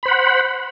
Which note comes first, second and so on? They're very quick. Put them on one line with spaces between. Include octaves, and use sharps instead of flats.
B5 C5 F#5